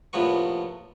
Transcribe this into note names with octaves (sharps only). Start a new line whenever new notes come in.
A#1 A2 C3 F3 B3 C#6